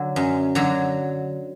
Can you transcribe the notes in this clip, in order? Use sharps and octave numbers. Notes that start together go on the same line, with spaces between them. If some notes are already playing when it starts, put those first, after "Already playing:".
Already playing: D3 F#3
F#2
D3 F#3